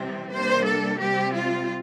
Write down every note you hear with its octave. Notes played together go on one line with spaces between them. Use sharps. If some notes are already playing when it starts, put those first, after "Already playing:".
Already playing: C3 E3 G3 C4
C3 G3 A#3 D4 C5
A4
C3 G3 C4 G4
F4